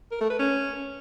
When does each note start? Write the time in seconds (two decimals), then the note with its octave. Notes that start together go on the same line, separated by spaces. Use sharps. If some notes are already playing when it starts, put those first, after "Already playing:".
0.12 A#4
0.21 A3
0.30 B4
0.40 C#4